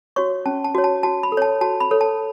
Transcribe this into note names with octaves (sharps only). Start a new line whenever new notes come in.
F#4 C#5 C#6
C#4 A5
A5
F#4 C#5
A5
F#4 A5
B5
A4
C#5 A5
F#4 A5
B5
A4 C#5
A5